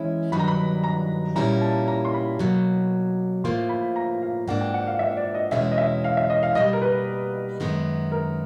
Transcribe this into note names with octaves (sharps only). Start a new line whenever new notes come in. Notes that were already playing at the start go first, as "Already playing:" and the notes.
Already playing: E3 G#3 C#4 E4
G2 D#3 F#3 B3 D4 B5
A#5
B5
A#5
A#2 G3 A#3 C#4 E4 A#5
A5
A#5
C6
B5
B2 F#3 A#3
A2 F3 A#3 C6
B5
A#5
F5
G#2 F3 A#3 D4 F#5
G5
F#5
F5
E5
D5
D#5
E2 B2 G#3 C#4 E4 E5
D#5
E5
F5
E5
D#5
F5
B2 G3 A#3 D#5
A#4
B4
F#2 D#3 G#3 B3
A#4